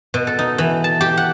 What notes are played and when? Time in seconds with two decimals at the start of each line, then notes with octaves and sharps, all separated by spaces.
0.14 B2
0.27 A4
0.39 D#4
0.58 E3
0.84 A5
1.01 G4
1.17 F#5